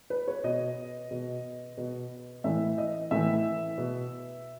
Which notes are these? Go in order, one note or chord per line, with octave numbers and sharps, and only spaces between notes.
B4
C#5
B2 D#5
B2
B2
A2 E3 E5
D#5
A2 E3 E5
B2